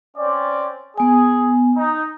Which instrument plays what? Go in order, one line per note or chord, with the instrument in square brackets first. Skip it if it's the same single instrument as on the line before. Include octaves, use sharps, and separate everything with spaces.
[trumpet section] C4 C#4 D5
[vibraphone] B3 G#5 [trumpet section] G#4
[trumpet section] D#4